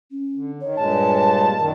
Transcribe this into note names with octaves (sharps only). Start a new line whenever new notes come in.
C#4
D3
D#3 C#5
G2 A#2 G#3 A5
F#2 A#2 D#3 A#4